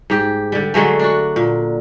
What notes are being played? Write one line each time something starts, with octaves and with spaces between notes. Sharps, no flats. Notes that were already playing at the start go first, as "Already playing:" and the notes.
G#2 G4
D3 G3
D3 F#3 G#3 A3
D4 F#4
A#2